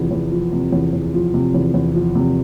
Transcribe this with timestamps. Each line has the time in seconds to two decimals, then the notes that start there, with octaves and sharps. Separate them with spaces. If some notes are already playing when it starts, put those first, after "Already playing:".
Already playing: E2 C3 F3
0.11 E2
0.32 F3
0.53 C3
0.72 E2
0.93 E2
1.14 F3
1.34 C3
1.54 E2
1.74 E2
1.95 F3
2.15 C3